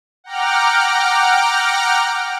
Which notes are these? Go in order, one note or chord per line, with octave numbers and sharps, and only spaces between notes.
F#5 G5 A#5 D6 F6